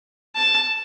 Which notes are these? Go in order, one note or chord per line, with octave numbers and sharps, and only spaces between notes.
A5